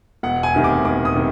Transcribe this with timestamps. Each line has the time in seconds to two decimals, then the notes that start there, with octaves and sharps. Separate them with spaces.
0.23 E1 F#5
0.43 G#5
0.54 D2 C3 D#3 G3
0.64 D6
0.85 E1 D6
1.05 D#6
1.15 C3 D#3 G3